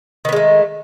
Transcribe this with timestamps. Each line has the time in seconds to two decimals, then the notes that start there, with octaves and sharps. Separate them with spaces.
0.25 D#3
0.29 B3
0.33 G#3
0.36 A3